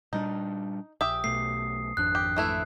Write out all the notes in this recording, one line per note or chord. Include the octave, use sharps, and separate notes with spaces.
A#2 G3 D4 D#4
A#1 G4 E5 D#6
B1 B2 A3 C7
G#1 F2 D4 F#6
G4
E3 A3 E4